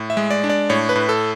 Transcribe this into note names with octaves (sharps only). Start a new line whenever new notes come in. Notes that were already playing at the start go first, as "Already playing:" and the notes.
Already playing: A2
E5
G#3
D5
D4
D5
A2 C#5
B4
A2
A4